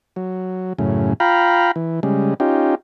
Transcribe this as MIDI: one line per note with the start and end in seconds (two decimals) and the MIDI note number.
0.16 0.73 54
0.79 1.13 42
0.79 1.13 45
0.79 1.13 49
1.20 1.71 65
1.20 1.71 77
1.20 1.71 79
1.20 1.71 82
1.20 1.71 83
1.76 2.00 52
2.03 2.34 49
2.03 2.34 55
2.03 2.34 56
2.40 2.75 61
2.40 2.75 63
2.40 2.75 65
2.40 2.75 67